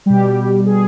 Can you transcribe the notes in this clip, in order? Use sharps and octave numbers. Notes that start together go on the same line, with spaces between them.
B2 G3 G4
G#4